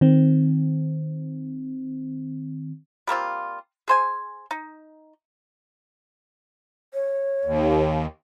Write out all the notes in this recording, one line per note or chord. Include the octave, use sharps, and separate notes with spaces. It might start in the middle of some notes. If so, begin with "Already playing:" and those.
D#3 C4
G3 A#3 C4 F4
G#4 C5 G#5
D#4
C#5
D#2